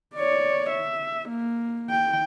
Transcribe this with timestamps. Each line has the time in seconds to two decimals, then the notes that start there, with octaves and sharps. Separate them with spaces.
0.15 C#5 D5
0.70 E5
1.29 A#3
1.90 G5